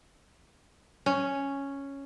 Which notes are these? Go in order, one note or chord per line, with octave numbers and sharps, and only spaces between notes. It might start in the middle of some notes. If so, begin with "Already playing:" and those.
C#4